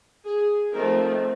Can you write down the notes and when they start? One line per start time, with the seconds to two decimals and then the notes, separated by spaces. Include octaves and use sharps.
0.25 G#4
0.73 F3 A3 C4 D#4 A#4